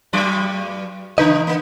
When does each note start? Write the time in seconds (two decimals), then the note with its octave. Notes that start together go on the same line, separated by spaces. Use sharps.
0.13 G2 F#3 D5
1.18 C#3 E3 D#4 B4 D#5
1.47 A#3